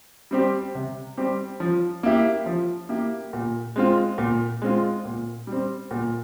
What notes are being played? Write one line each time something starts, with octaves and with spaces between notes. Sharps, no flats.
G3 C4 G4
C3
G3 C4 G4
F3
A#3 E4 G4
F3
A#3 E4 G4
A#2
G#3 C4 F4
A#2
G#3 C4 F4
A#2
G3 C4
A#2